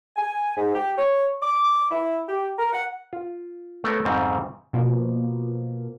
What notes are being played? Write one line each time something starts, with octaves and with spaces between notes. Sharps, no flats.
G#5
G#2
G4
C#5
D6
E4
G4
A#4
F#5
F4
A3 B3 A#4 C#5
F2 G#2 C#3 G3 C4
B2 F3 A#3